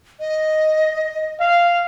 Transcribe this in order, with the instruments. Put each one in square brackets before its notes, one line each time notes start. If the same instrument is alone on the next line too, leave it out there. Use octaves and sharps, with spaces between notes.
[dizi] D#5
[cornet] F5